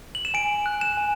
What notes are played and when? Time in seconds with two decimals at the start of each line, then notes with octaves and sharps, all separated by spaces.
0.15 F#7
0.25 E7
0.34 G#5 D7
0.66 F#6
0.81 E7
0.97 G#5